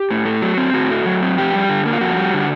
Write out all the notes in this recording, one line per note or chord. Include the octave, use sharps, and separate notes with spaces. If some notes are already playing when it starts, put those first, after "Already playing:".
Already playing: G4
A2
A3
F#3
C4
A2 F#4
A3
F#3
C4
F2 G4
G3
D3
A#3
F4
F2 F#4
G3
D3